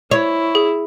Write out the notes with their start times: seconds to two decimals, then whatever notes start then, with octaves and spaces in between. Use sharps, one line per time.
0.11 E4 C#5
0.55 G#4